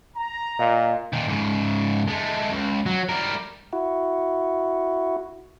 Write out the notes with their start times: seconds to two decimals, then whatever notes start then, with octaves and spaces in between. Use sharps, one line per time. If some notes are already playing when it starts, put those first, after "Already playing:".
0.16 A#5
0.59 A#2 D#5 F5
1.13 A#2 D#3
1.28 G#2 C#3
2.08 G#3 A3
2.52 C#2
2.86 F#3
3.09 G3 A#4
3.73 E4 F#4